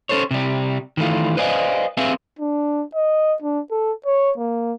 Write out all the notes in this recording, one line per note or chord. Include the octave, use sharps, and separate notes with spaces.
C#4 D4 A4 C5 C#5
C3 G3
D#3 E3 A3 F4
B4 C5 D5 D#5 F5 G#5
C4 G#4 B4 E5 F5 G#5
D4
D#5
D4
A4
C#5
A#3